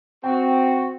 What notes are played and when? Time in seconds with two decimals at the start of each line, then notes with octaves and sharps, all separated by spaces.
0.24 C4 F#4 G5